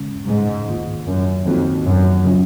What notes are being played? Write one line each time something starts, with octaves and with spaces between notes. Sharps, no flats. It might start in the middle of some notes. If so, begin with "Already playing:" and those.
Already playing: C#3 G#3 C#4
G#2
D#3 A#3 F4
F#2
F2 D#3 A#3 D#4 F#4
F#2
C#3 F#3 C#4 F4